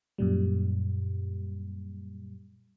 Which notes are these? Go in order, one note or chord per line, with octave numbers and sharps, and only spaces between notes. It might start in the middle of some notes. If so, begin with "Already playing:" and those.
F#2 A#2 G3